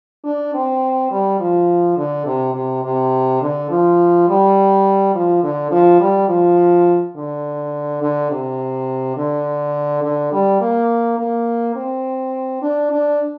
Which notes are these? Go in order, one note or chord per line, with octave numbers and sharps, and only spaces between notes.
D4
C4
G3
F3
D3
C3
C3
C3
D3
F3
G3
F3
D3
F3
G3
F3
D3
D3
C3
D3
D3
G3
A#3
A#3
C4
D4
D4